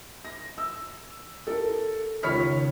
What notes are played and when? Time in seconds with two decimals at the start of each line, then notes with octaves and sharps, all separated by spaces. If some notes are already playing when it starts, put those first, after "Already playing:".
0.25 A#6
0.58 E6
1.47 A4 A#4
2.23 C#2 D#3 C#5 B5 F6 B6